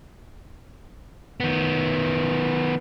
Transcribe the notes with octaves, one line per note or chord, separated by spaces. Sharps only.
D#3 B3